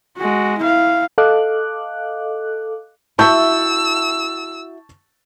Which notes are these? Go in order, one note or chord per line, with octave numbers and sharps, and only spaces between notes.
G#3 F#4
E4 F5
A4 D#5 F5 D6 F#6
E4 F#4 E5 A5 C#6 E6 G6